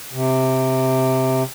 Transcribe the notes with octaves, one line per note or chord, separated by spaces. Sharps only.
C3